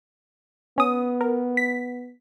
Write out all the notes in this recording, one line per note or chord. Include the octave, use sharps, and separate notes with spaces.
B3 C#4 D#6
A#4
B6